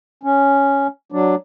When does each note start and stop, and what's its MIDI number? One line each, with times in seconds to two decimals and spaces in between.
0.23 0.87 61
1.12 1.35 54
1.12 1.35 62